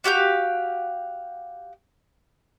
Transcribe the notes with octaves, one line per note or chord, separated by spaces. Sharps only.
F#4 G4 F5 G6